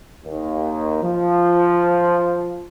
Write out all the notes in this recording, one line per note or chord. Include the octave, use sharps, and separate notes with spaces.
D#2
F3